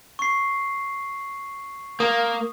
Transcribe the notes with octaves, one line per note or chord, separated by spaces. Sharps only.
C#6 C7
A#3 D#6